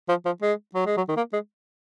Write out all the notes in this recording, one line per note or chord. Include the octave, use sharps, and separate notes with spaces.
F3
F3
G#3
F#3
G#3
F#3
D#3
A#3
G#3